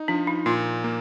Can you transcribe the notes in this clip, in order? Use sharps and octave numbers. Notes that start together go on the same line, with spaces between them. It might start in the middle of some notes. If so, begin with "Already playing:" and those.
Already playing: D#4
F3 D4
D#4
A#2 F4
A#3